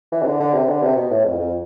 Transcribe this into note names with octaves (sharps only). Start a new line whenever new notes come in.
E3
C3
D3
D3
C3
D3
C3
B2
A2
F2
F2